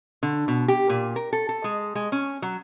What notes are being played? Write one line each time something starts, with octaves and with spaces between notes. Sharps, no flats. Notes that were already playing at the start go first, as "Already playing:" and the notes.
D3
B2
G4
A#2
A#4
A4
A4
G#3
G#3
C#4
F#3